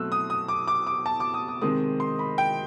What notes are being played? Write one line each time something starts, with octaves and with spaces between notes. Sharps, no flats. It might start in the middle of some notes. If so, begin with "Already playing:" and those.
Already playing: B2 F#3 A3 C4 E6 F#6
D#6
D#6
D6
D6
D6
A5
D6
D#6
D#6
C3 D#3 G#3 C4 D#6
C6
B5
G5